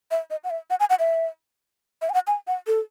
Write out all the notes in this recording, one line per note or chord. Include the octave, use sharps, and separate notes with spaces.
E5
D#5
F#5
E5
F#5
G#5
F#5
E5
E5
G#5
F#5
G#5
F#5
A4